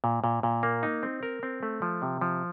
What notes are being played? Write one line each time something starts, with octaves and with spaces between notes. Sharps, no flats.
A#2
A#2
A#2
A#3
D#4
C4
A#4
C4
A3
F3
C3
F3